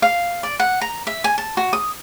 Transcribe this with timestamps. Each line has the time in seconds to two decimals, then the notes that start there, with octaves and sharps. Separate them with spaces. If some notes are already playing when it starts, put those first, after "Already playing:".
0.02 F5
0.43 D5
0.59 F#5
0.81 A#5
1.07 E5
1.24 G#5
1.38 A5
1.57 F#4
1.73 D#6